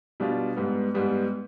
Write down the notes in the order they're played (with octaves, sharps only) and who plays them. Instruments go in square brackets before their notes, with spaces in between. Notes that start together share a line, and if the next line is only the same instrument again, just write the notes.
[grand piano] B2 G3 D4 F4
G#2 G3 B3
G#2 G3 B3